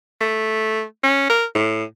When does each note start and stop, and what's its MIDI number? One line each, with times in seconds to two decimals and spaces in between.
0.21 0.83 57
1.03 1.29 61
1.29 1.45 70
1.55 1.84 45